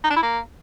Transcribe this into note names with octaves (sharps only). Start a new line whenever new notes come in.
D#4
D4
E4
A#3